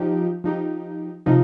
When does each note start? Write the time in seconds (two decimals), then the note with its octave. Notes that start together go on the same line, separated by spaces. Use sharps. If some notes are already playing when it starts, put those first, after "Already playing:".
Already playing: F3 D#4 G4
0.44 F3 D#4 G4
1.26 C3 F3 D#4